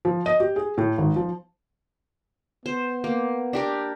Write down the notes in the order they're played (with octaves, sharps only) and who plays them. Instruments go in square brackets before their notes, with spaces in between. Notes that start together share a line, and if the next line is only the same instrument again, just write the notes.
[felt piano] F3
D#5
G4
G#4
A2
G#1
F3
[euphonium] B3 [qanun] C5
[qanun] A#3
D4 G4 A#4